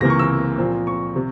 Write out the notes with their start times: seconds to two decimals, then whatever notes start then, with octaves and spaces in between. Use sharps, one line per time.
0.01 C#2 C3 E3 A#3 A#6
0.10 C#6
0.19 E6
0.58 A#2 F3 C4
0.87 C#6
1.16 C3